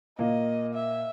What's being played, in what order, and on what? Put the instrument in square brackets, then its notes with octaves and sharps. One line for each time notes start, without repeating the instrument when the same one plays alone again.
[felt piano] A#2 A#3 [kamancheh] D#5
[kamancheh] E5